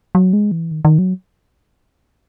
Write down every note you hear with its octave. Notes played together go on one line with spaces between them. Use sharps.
F#3
G#3
E3
D#3
D#3
F#3